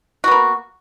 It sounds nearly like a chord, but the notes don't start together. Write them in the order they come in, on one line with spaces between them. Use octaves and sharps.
F#4 B3 A#3